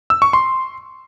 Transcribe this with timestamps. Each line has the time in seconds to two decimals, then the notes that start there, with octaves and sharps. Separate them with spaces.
0.10 E6
0.22 C#6
0.33 C6